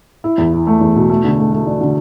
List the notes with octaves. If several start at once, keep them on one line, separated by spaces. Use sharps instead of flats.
E4
E2
E4
A3
E2
B2
A3
D3
A3
A3
D4
D3